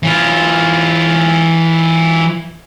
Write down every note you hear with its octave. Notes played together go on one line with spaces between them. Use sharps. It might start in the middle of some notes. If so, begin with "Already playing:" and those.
E3 F4